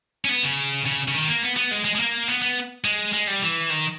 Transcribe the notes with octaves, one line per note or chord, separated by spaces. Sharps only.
C#4
B3
C#3
C#3
C#3
D#3
A#3
B3
B3
G#3
G#3
G#3
A#3
B3
B3
G#3
G#3
G3
E3
D#3